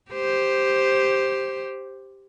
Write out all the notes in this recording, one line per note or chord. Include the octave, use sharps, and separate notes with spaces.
G4 C5